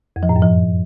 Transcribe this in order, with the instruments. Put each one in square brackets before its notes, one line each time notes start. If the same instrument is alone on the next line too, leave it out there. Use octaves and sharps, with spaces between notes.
[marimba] F2
F3
A2
F#2
F3